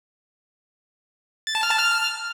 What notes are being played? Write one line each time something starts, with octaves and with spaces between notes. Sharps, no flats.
A6
A5
F6
A5
F6